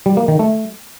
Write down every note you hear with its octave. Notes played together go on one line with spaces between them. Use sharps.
G3
A#3
D#3
A3